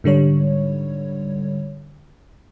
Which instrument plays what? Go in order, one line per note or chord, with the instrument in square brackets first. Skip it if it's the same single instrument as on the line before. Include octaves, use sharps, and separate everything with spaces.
[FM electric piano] G#2 D3 G3 C#5